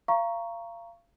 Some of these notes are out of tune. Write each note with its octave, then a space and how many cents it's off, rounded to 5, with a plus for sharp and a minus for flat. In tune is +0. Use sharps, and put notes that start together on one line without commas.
F5 -30 A#5 +0 C#6 +0